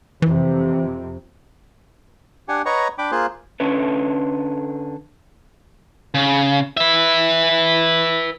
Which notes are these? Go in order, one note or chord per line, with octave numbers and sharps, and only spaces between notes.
F2 C3 E3
D4 G4 F#5 G#5
B4 C#5 D#5 F#5 A#5 C#6
D4 G5 B5 D6
A#3 F4 G#4 C5 F#6
D3 C#4 A4 B4
C#3
B4 E5